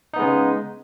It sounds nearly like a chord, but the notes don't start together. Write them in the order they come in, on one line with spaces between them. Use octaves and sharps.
D#4 B3 G#3 C#3